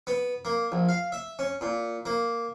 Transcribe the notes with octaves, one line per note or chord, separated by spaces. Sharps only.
B3
A#3
A#1
F5
E5
C#4
A#2
A#3